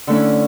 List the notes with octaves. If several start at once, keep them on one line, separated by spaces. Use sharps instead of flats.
D3 A3 C#4 E4